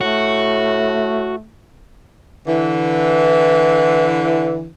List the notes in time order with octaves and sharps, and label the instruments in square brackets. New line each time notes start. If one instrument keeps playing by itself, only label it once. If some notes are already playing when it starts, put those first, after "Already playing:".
[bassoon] A2 [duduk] A3 [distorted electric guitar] F#4
[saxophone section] D3 E3